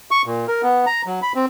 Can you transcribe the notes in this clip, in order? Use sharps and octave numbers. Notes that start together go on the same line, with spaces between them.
C#6
A#2
A#4
B3
A#5
F#3
B5
C4